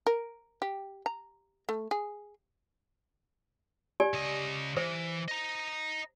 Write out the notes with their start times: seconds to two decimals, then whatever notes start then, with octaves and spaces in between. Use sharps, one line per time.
0.07 A#4
0.62 G4
1.06 A#5
1.69 A3
1.91 G#4
4.00 G4 D5 G#5
4.14 C#3 D#5
4.77 E3 C5
5.28 D#5 A#5